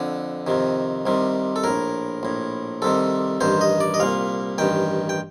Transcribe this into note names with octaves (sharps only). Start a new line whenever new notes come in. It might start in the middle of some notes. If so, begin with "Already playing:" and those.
Already playing: F2 D3
F2 C3 D#3
C2 C3 D#3
A4
A#1 A2 A#4
A#1 A2
C2 C3 D#3 A4
A1 G2 D#3 C5
D#5
D5
D#5
C2 A#2 F5
A1 G2 D#3 G5
G5